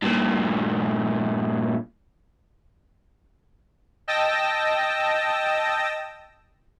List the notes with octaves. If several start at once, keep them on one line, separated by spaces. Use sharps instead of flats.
G2 A#2
D#5 G5 A5 E6 A#6